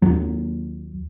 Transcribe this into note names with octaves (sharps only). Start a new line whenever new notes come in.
D#2 F#3